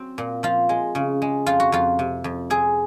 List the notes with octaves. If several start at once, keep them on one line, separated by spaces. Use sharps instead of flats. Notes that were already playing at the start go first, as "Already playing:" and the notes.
Already playing: F#3 C4
A#2
F3 F4
G#3
C#3
G#3
F2 F4
F#4
F2 F4
C3
F2
C4 G#4